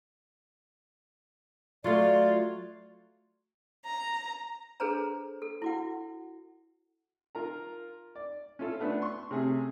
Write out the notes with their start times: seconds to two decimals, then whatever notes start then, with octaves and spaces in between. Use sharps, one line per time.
1.84 F#3 A3 F4 D5
3.85 A#5
4.80 D4 G#4 A4 B4 C5 A#5
5.42 A4
5.62 E4 F#4 F#5
7.35 F4 A#4 A#5
8.15 D5
8.59 C#4 E4 F4 A4
8.80 A3 B3 D4
9.02 C6 C#6
9.31 C3 A3 C#4 G#4